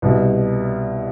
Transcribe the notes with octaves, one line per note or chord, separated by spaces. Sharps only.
C2 B2 G3